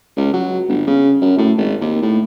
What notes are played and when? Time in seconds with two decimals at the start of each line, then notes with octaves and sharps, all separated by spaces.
0.16 C#2
0.33 F#3
0.69 G1
0.87 C#3
1.21 F#2
1.38 A2
1.57 G#1
1.81 D#2
2.02 A2